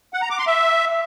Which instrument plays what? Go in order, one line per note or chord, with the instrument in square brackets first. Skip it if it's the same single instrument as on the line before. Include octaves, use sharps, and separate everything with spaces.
[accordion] F#5
A#5
D6
C6
E5